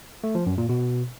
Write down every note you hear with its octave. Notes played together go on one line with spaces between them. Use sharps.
A3
F3
F#2
A#2
B2